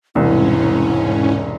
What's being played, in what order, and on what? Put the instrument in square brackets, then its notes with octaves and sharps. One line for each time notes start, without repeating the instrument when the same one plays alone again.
[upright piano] E1 C2 [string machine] G#2 C#4 [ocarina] E4